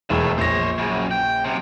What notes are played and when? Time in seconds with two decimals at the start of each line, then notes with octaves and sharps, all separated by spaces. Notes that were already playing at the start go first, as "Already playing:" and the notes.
0.10 E1 A2 A3
0.38 A#1 C5 C#5 A#6
0.78 F#2 C#3
1.11 G5
1.44 F#2 C3